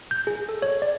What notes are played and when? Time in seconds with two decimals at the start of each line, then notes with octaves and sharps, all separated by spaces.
0.11 G6
0.27 G#4
0.49 A4
0.62 C#5
0.82 D5